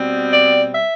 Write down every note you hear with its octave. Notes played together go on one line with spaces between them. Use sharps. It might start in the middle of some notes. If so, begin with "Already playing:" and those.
Already playing: B2 G3 C4
D5
E5